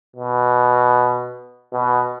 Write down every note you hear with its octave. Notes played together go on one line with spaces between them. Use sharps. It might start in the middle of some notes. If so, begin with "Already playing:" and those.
B2
B2